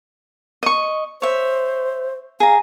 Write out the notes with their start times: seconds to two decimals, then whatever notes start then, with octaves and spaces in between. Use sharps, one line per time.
0.63 D#5 C#6
1.22 C5 C#5 E5
2.40 G#4 F5 A#5